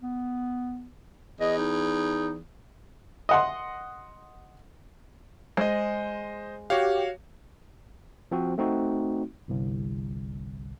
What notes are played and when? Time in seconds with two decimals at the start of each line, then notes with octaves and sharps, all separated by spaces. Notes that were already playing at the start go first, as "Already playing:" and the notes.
0.02 B3
1.40 E2 D#5
1.58 D#4
3.29 D#5 F#5 C6
5.57 G#3 C5 D#5
6.70 F#4 G4 C#5 F5
8.31 F3 C4 F#4
8.58 A3 C4 D#4 F#4
9.48 G1 C2